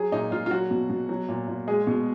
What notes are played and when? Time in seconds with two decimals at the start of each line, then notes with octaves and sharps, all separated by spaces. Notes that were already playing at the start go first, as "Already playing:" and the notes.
Already playing: F#3 G#4
0.12 A#2 D#4
0.31 A#2 F4
0.46 F4
0.51 F#3 F#4
0.70 B2
0.89 B2
1.09 F#3
1.29 A#2
1.48 A#2
1.68 G#3 G#4
1.87 B2